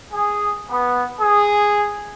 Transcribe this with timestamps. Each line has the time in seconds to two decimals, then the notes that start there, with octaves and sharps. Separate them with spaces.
0.13 G#4
0.70 B3
1.21 G#4